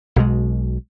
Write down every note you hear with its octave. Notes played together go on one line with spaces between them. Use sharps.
B1 B2 G#3